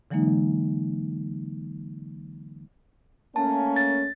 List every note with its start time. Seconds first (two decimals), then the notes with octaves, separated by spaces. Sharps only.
0.11 D3 E3 F#3 G#3 A#3 D#4
3.36 A3 A#3 C#4 A5
3.76 A6